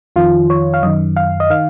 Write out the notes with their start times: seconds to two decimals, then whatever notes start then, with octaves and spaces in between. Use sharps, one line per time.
0.16 F2 D#3 F4
0.50 C#5
0.74 F5
0.83 F#2 D#3 D#5
1.16 F5
1.40 D#5
1.50 D#3 F5